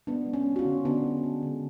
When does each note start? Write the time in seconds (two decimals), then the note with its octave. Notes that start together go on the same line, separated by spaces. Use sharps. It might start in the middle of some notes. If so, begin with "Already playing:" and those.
0.07 G#3 B3 D4
0.27 G#3
0.33 C#4
0.46 G#3
0.56 F#4
0.59 C#4 F4
0.65 D3
0.85 D3 B3 D4
1.04 G#3
1.24 G#3
1.43 D3